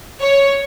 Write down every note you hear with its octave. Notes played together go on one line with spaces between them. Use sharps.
C#5